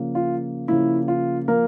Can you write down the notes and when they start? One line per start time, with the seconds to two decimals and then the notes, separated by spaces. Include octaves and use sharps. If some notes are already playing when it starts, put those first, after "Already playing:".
Already playing: C#3 F3 A#3
0.15 F4
0.68 C#3 F3 A#3 E4
1.08 F4
1.48 F3 A#3 A#4